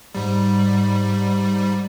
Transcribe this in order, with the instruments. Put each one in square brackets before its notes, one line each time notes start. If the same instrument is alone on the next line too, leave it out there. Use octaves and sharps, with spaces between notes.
[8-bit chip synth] G#2 G3